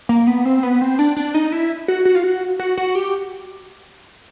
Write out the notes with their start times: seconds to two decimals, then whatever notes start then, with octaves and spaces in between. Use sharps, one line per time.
0.09 A#3
0.27 B3
0.45 C4
0.63 B3
0.81 C4
0.99 D4
1.16 D4
1.34 D#4
1.52 E4
1.88 F#4
2.05 F#4
2.15 F4
2.24 F#4
2.59 F#4
2.77 F#4
2.95 G4